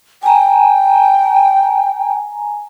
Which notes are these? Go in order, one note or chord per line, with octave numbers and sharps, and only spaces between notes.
G5 G#5 A#5